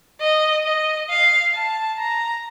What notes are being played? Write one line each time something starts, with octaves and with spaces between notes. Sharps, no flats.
D#5
D#5
F5
A5
A#5